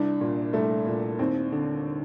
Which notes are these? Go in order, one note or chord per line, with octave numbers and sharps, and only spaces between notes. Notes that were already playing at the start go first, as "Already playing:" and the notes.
Already playing: C2 D4
A#2
C2 A3
A#2
D#2 C4
D3